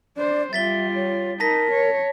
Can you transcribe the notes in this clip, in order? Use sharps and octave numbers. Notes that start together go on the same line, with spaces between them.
D4 C5 D5
G3 F4 E5 A6 B6 G7
C#5
D#4 A#4 A5 A#6 B6
C#5